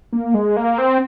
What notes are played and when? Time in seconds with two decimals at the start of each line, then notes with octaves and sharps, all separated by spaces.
0.13 A#3
0.34 G#3
0.57 A#3
0.78 C4